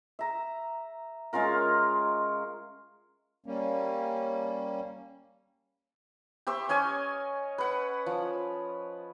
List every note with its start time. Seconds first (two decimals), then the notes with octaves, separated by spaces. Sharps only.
0.19 E5 A#5
1.33 G#3 C#4 F4 A#4
3.46 G3 A#3 C#4
6.47 G4 C5 E5 C#6
6.69 C#4 C#5 D#5 G#5
7.58 B4 F#5
8.06 F3